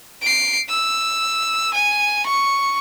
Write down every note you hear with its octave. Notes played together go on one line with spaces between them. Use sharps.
C7 D7
E6
G#5
C#6